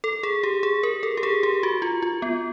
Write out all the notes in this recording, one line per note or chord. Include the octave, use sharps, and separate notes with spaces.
A4
G#4
G4
G#4
A#4
A4
G4
G#4
G4
F#4
F4
F4
B3